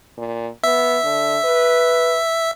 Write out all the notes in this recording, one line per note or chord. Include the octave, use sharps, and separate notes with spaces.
A#2
B3 E5
D3
B4